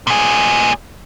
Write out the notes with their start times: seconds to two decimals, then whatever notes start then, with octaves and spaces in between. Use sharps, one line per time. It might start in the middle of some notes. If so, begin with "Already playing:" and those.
0.07 A#2 G#4